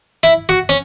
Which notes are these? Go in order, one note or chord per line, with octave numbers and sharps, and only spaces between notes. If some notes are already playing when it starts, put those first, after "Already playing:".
E4
F#4
C#4